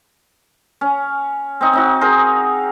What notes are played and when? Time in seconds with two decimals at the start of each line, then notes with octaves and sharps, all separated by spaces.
0.81 C#4
1.61 C4 D#4
1.73 C4 D#4 F#4
2.01 D#4 G#4 A#4 C5